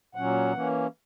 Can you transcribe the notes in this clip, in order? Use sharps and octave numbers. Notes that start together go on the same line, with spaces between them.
A#2 F#3 C#4 F#5
E3 A#3 C#4